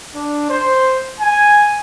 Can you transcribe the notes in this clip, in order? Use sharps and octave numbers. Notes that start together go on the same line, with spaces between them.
D4
C5
G#5